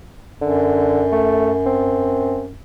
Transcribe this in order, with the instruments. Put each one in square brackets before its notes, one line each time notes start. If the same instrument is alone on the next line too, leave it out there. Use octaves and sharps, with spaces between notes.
[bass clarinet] F#2 [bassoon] D3
[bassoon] A3
C4